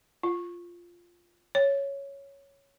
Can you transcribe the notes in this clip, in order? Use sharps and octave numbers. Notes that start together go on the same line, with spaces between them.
F4
C#5